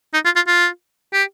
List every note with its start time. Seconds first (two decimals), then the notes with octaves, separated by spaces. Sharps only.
0.14 D#4
0.25 F4
0.36 F4
0.47 F4
1.13 G4